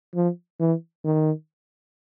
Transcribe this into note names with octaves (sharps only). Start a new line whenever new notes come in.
F3
E3
D#3